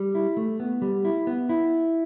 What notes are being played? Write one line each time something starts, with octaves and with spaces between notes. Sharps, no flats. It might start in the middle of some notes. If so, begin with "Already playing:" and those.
Already playing: G3
E4
A3
B3
G3
E4
B3
E4